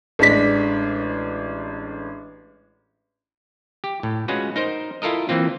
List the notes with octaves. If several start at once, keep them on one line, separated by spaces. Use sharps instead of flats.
A1 G#3 D4 B6
G4
A2
G#3 C#4 F4 F#4 B4
D#4 A#4 C5
E4 F4 A4 A#4 D#5
E3 A#3 C4 F4